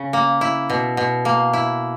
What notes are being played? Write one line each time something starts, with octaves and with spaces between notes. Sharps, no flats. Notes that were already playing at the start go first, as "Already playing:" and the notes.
Already playing: C#3
A#3
E4
B2
B2
A#3
E4